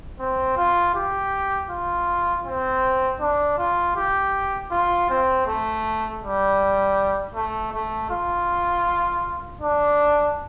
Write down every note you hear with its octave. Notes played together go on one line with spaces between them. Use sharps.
C4
F4
G4
F4
C4
D4
F4
G4
F4
C4
A3
G3
A3
A3
F4
D4